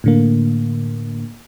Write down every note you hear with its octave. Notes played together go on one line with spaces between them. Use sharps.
A2 D3 A#3